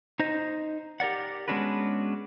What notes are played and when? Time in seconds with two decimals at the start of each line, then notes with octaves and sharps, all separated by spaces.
0.19 D#4 C5 D#5
1.00 G4 A#4 D5 F#5
1.48 G#3 B3 C#4 D4 F#4 B4